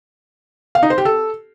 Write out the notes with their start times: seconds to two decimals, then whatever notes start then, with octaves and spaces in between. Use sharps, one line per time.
0.75 F5
0.83 D#4
0.90 C5
0.98 G4
1.05 A4